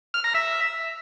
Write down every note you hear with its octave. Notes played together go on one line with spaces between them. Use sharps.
F6
A#5
E5